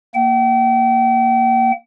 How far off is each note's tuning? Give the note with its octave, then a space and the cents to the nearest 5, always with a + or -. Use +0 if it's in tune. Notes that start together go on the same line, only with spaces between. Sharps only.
A#3 +0 G5 -40